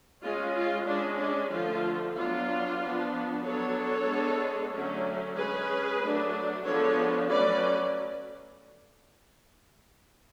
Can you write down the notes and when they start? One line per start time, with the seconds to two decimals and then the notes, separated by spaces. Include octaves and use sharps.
0.23 G#3 C#4 F4
0.54 F4
0.86 G#3 C#4 D4
1.19 D4
1.51 D3 F3 A3 F4
2.15 F#3 B3 D4 F4
2.80 F3 B3 D4
3.43 F#3 B3 D4 A4 C#5
4.08 G#3 B3 D4
4.73 D3 F#3 A3 C#4
5.36 G#3 C#4 G#4 B4
6.01 F#3 A3 D4
6.65 F3 G#3 B3 D4 A4 C#5
7.29 F#3 A3 C#4 B4 D5